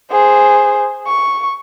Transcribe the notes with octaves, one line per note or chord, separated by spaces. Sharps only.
G#4 C5
C#6